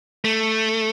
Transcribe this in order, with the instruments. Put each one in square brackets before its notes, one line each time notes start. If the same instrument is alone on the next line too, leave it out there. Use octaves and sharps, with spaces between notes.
[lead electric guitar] A3